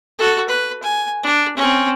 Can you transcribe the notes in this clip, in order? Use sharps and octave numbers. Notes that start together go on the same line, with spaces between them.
F#4 A4
B4
G#5
D4
C4 C#4